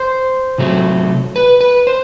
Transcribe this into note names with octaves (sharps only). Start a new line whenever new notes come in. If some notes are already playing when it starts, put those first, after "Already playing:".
Already playing: C5
C3 F#3 A3
B4
B4
C5